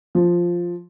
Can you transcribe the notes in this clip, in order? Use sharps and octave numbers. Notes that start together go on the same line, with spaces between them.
F3